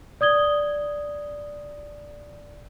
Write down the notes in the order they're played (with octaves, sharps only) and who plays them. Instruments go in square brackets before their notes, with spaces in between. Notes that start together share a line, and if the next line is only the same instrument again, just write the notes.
[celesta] D5 D#6 G#6 G7